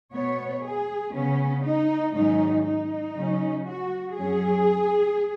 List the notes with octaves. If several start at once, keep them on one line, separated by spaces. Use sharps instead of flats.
B2 B3 C#5
G#4
C#3 B3 C#4
D#4
G#2 D#3 F#3 C#4 D#4
D#4
C#3 F#3 C#4
F#4
F#2 F#3 C#4 G#4